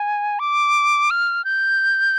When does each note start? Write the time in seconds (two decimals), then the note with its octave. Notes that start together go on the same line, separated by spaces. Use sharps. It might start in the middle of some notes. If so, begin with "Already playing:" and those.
Already playing: G#5
0.39 D6
1.10 F6
1.45 G6